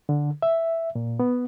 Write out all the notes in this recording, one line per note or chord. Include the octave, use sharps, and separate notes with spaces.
D3
E5
A#2
B3